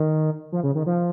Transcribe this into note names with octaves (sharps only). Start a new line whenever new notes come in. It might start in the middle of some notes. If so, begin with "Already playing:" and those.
Already playing: D#3
F3
C#3
D#3
F3